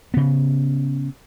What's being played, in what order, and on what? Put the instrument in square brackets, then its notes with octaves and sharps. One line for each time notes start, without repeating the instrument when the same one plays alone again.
[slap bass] C#3 B3